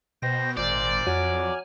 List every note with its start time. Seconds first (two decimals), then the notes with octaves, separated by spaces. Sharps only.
0.22 B2 C5 G5 A#6
0.57 G#1 A#2 C5 D5
1.07 F2 F#3 G#5 F6